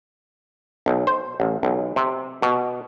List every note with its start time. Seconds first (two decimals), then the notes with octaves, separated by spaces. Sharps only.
0.86 B1
1.07 C5
1.40 A1
1.63 B1
1.96 C3
2.42 B2